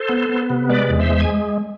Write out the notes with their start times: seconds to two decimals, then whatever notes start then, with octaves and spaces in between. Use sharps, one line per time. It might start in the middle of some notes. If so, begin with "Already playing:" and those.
Already playing: A4 C5
0.09 B3
0.29 B3
0.50 C3
0.69 G#3 B4 D5
0.90 E2
0.99 C5 E5
1.10 G#3
1.20 G#5